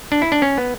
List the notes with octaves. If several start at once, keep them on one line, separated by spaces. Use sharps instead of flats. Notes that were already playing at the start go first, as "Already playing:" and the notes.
D4
E4
D4
C#4
B3